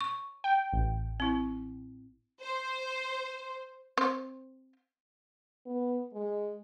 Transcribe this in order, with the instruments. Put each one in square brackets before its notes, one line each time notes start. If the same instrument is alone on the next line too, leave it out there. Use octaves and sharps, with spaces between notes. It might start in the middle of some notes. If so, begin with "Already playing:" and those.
[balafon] C#6
[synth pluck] G5
A1
[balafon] C4 E4
[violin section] C5
[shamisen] C4 C5
[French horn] B3
G#3